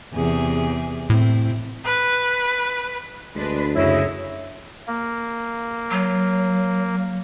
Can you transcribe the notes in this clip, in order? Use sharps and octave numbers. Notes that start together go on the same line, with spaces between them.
E2 C3 G#4
A2 C4 E4
B4
D2 G#3 D4 B4
F#2 C#3 E4 C#5 D#5
A#3
F#3